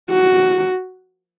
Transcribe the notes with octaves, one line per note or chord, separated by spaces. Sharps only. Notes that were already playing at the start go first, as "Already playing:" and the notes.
F#4